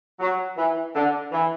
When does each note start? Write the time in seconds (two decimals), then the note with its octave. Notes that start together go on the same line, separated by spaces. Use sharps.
0.20 F#3
0.57 E3
0.94 D3
1.32 E3